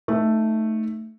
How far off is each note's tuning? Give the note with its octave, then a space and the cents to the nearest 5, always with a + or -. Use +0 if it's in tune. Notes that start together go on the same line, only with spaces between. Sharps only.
A3 +0 D#4 +0